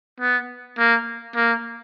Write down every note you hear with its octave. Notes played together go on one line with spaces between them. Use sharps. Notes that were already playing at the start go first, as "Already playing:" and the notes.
B3
A#3
A#3